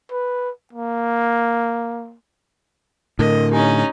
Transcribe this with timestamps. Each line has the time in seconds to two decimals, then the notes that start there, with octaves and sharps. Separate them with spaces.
0.11 B4
0.73 A#3
3.19 A2 D3 A#4 D#5
3.52 C#4 D#4 G4 G#5